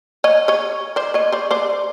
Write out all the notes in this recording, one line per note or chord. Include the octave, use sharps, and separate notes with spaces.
C#5 D#5
C#5 D#5
C5 D5
C#5 D#5
C5 D5
C5 D5